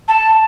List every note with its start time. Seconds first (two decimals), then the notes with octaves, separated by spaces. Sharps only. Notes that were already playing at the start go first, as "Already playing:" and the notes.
0.08 A5